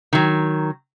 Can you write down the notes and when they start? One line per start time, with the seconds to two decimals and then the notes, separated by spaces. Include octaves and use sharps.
0.13 D#3 F#3